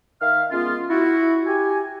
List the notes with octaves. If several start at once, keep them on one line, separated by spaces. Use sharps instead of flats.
D#3 E5 F5 F6
G#3 B3 C#4 F4
E4 F#4
G4 G#5